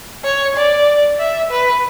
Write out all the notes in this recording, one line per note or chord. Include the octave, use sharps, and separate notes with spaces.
C#5
D5
E5
B4